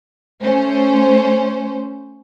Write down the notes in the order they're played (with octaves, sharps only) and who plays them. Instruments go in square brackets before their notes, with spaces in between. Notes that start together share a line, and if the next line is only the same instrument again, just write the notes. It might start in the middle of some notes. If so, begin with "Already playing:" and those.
[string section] A3 C#4 C5